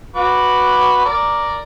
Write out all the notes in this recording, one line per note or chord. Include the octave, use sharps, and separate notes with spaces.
F#4 B4 D6
A#4 D5